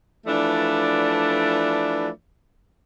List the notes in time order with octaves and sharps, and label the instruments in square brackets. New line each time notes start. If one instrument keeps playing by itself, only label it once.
[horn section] E3 F3 A3 D4 B4 D5